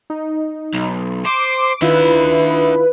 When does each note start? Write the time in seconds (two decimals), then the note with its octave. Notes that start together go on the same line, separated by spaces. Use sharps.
0.10 D#4
0.74 B1
1.25 C5 C6 D6
1.82 D#3 D4 E4 F4 B4 E5